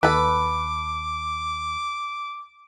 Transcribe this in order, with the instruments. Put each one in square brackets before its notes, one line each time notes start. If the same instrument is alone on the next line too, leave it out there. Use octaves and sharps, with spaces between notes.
[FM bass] D#2 [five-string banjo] A4 B4 [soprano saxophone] D6